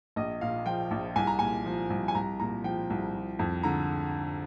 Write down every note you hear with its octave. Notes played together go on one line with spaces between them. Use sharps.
A#1 D#5
A#2 F5
F3 G5
A#1
C2 G#5
A#5
A#2 G#5
F3
C2
G#5
C2 A#5
A#2 A#5
F3 G5
C2
F3
F2
D3 A#5